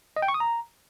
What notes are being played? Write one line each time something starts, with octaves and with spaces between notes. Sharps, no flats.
D#5
G5
C#6
D#6
A#5